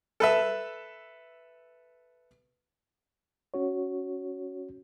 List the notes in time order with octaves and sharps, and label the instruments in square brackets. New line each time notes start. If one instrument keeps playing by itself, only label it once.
[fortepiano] A4 B4 E5
[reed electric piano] C#4 F#4 C#5